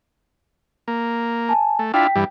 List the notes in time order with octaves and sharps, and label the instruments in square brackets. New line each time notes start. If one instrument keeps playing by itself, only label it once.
[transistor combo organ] A#3
[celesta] G#5 A5
[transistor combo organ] A3
[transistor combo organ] D4 E4 F4 [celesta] G5 B6
[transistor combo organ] G2 E3 G3